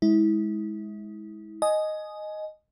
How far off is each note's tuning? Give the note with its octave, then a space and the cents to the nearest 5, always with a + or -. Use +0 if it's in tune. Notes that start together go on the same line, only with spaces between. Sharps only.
G#3 +5 E4 -30
D#5 -5 G#5 +20